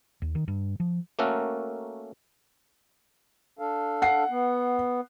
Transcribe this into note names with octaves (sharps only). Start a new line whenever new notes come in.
D#2
D#3
G2
F3
A3 A#3 C#4 F#4 A4 A#4
D4 A4 F5
F#5 C7
B3